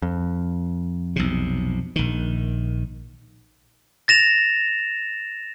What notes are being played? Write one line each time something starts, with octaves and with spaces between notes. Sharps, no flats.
F2
B1 C3
A#1 D#3
A6 A#6 E7 F7